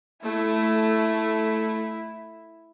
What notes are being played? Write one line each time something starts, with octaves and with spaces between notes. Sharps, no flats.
A3 E4